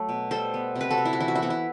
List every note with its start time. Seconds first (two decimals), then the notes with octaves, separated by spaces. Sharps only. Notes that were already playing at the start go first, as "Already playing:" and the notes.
Already playing: F#3 A3
0.09 B2
0.31 G3 A4 C5
0.54 B3
0.76 C3
0.81 B4
0.90 F#4 A4
0.98 C3
1.05 E4
1.13 F#4
1.20 E3 E4
1.28 F#4
1.35 E4
1.42 B3 F#4
1.50 E4